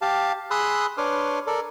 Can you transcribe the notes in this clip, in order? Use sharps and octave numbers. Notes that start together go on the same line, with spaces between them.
G4 F5 A5
G#4 B5 C6 D#6 E6 F#6
D4 B4 C#5 C6 D6 F6
A4 A#4 D5